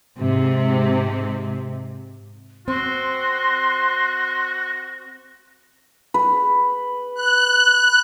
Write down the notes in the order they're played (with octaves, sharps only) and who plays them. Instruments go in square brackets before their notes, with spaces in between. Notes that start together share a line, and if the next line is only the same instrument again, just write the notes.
[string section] G#2 C3
[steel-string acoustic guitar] C4 [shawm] F#4 [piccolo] C6
[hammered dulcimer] B4
[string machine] F#6